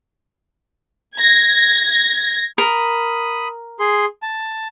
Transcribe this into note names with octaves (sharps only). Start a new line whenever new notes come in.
G#6 A#6
A#4 B5 D#6
G#4 C6
A5